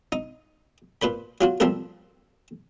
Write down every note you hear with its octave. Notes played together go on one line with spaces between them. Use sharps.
D#4
A#2 B4 C5 B5
F#3 F4 F#4
F3 G3 A#3 C4 A4 A#4